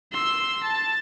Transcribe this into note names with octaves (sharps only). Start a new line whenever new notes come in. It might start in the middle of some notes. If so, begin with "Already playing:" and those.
C6 E6
A5